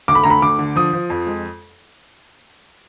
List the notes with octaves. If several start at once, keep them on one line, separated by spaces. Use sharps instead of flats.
D2 D6
B5
D2 A#5
B5
D2 D6
D3
F3 D#6
F3
F2
G#3